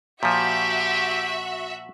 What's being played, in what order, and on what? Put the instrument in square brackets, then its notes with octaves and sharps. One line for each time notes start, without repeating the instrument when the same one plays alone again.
[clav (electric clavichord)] A#2 F3 [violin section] F#4 E5 [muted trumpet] G4